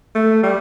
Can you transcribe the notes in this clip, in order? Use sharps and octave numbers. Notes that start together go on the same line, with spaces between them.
A3
G3